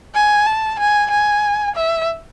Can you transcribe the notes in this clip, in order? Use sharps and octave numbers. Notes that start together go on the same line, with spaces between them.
G#5
A5
G#5
G#5
E5